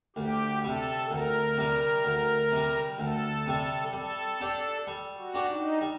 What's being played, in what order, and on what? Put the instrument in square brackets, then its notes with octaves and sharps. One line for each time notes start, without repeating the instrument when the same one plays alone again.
[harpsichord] D2 [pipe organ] G4
[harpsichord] C3 G3 [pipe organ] A4
[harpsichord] D2 [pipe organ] A#4
[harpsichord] C3 G3
D2
C3 G3
[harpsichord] D2 [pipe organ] A4
[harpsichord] C3 G3
[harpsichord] G3 [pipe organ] A4
[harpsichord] D4 G4 D5
G3
[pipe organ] F#4
[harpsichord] D4 G4 D5
[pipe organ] D#4
[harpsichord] G3